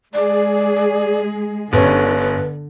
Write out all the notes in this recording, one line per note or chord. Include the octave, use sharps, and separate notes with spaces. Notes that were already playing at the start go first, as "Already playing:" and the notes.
G#3 G#4 D5
G1 D3 C#4 B4